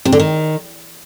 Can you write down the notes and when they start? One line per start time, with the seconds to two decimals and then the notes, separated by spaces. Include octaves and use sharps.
0.05 C3
0.12 D3
0.20 D#3